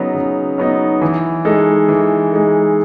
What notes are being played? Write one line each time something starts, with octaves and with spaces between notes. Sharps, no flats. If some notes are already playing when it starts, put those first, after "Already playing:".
Already playing: C#3 F#3 B3 D#4
C#3
F#3 B3 D#4
E3
G#3 D#4 A4
E3
G#3 D#4 A4